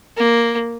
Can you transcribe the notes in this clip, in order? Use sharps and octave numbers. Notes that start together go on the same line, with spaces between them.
A#3